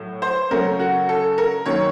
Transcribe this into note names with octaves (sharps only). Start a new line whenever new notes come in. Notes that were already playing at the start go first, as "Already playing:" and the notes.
Already playing: A2 F#3
C5
C#3 F#3 A3 C#4 A#4
F#4
A4
A#4
F#2 D#3 A#3 C#4 C#5